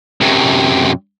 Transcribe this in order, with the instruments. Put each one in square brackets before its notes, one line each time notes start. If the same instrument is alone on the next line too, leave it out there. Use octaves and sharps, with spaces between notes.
[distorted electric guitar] F#2 C3